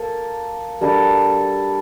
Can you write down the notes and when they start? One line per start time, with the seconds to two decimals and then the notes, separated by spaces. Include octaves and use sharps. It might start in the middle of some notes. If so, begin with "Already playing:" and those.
Already playing: A#3 A4
0.81 G3 A#3 D4 A4